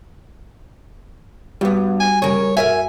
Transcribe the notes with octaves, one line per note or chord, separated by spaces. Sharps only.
G2 G3 B3 F#4
G#5
F#2 C#3 G3 G#4 A#4 C#5
G3
G2 F#4 A#4 B4 E5 G#5